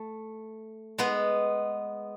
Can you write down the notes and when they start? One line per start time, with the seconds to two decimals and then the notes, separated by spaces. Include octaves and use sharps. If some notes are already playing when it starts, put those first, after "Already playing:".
Already playing: A3
0.98 G#3 B3